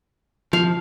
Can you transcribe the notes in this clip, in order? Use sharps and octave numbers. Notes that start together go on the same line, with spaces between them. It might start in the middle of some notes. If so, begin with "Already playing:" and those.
F3 F5